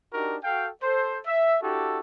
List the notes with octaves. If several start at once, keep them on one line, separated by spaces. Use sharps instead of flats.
D4 D#4 F#4 G4 A#4
F#4 A4 F5 G5
A4 C5
E5
D4 E4 F#4 G4 A4